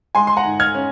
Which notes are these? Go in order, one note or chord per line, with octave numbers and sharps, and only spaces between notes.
G#3 G#5 C6
C6
F#5 A#5
G#2
F6 G#6
C#4